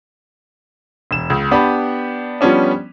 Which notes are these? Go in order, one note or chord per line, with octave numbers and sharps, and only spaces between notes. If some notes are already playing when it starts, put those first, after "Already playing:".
E1 E7
C#2
B3 D4 G4 B5
F3 G3 B3 C#4 D4